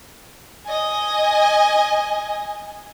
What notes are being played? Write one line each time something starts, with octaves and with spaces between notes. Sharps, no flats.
D#5 G#5